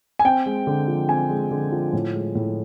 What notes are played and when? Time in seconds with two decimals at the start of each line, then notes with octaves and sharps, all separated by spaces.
0.19 G#5
0.25 C4 G5
0.46 G#3
0.67 D3
0.88 F3
1.09 C4 G#5
1.30 G#3
1.51 D3
1.72 F3
1.93 A2
2.14 G#3
2.35 A2